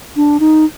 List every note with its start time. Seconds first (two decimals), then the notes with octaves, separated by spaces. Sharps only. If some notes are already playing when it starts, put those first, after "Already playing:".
0.16 D4
0.40 D#4